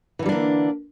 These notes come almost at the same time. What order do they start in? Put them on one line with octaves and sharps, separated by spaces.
E3 D3 G3 D4 A#3